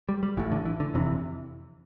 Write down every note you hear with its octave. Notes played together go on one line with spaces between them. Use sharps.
G3
G3
A1 A2 E3
D3
E3
D3
F1 F2 C3 E3